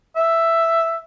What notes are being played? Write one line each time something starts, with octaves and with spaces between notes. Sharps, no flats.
E5